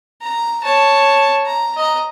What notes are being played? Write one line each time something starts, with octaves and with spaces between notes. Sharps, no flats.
A#5
C#5 A5
A#5
D#5 A#5